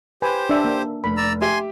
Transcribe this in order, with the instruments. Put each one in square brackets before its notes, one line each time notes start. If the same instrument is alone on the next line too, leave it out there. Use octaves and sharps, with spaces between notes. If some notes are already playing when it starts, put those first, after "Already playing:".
[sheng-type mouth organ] G4 C5 [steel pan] B4 G#5
[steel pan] D4 E5
A#3
[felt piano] F1 [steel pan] B5
[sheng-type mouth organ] D5 A#5 E6
[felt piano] G4 E5 [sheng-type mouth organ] G#5 C6